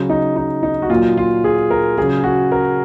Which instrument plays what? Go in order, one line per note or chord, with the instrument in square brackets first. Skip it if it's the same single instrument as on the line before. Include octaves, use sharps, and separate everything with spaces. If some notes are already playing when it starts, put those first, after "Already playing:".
Already playing: [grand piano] C#3 F#3
D#4
D#4
D#4
F#4
A#2 F#3 F4
F4
G#4
A#4
F#3 G#4
C#3
F#4
A#4